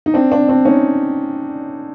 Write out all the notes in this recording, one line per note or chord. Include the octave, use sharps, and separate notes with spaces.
D#4
C4 D4
C4 D4
C4 D4
C#4 D#4